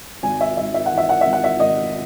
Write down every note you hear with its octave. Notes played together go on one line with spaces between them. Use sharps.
G#1 G#5
E5
G#2 E5
E5
F#5
E3
E5
F#5
G#1 E5
F#5
E5
G#1 D#5